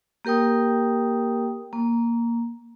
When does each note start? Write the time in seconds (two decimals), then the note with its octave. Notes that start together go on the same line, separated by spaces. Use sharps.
0.25 A#3 G4 A#4 G5 D#6
1.73 A#3